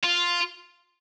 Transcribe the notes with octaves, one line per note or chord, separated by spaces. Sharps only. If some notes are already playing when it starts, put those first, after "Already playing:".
F4